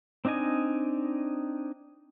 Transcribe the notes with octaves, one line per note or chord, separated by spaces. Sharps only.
C4 D4 D#4 D#5 G#5